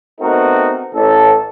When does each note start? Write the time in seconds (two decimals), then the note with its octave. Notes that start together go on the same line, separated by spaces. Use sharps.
0.20 A3 B3 C4 D#4 F#4 A#4
0.93 A1 A4